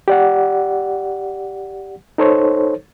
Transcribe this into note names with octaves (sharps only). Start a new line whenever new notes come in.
G4 D5 F#5
D#4 A4 C5 C#5